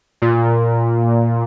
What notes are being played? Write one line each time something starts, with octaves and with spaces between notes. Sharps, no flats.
A#2